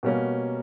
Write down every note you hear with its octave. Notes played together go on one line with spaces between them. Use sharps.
B2 G3 A#3 C#4